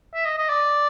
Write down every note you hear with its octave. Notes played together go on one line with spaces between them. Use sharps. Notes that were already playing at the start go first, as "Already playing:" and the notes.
E5
D#5
D#5
D5